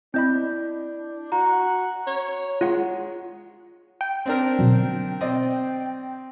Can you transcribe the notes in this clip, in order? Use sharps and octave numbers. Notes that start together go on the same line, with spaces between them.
C4 D4 E4 D#5 B5 G6
F#4 A#5
C#5
G#3 F4 C#5 F#5
G5
C4 D4 A#4
B2 D3 F#3
C4 D5 D#5